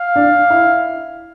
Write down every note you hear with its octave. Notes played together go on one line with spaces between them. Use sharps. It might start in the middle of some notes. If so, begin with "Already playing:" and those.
Already playing: F5
D4
E4